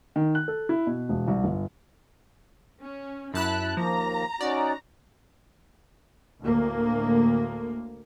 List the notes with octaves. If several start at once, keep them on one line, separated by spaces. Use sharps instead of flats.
D#3
F#6
A4
E4
B2
E1
C2
G1
C#4
F#2 E4 A5 B5 F#6
D#2 D#3 F3 A#3 A#5
C#4 D#4 F#4 D5
D2 A2 A#3